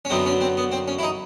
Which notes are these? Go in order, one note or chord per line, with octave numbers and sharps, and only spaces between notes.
C#4
F#2 D3 F#3 B3 C4
C#4
C4
B3
C4
C#4
E4
D#4